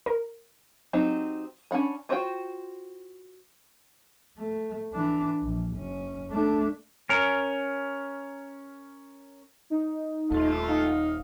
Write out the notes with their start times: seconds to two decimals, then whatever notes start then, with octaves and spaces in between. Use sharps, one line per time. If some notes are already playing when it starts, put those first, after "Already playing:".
0.06 A#4
0.93 F#3 C4 D#4 G4
1.71 C#4 D4 F#5 B5
2.09 F4 F#4 C5 D5 G5
4.37 A3
4.93 E3 D4
5.42 A#1
5.75 F#1 C#4
6.30 A3 D4
7.09 C#4 A#4
9.70 D#4
10.31 D#1 A3 F4
10.68 D#4 F5